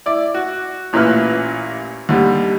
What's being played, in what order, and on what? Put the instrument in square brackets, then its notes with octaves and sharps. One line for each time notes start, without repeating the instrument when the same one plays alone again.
[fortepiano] E4 D5
F#4
A1 A#2 C#4 E4 B4 F6
D#2 D3 G3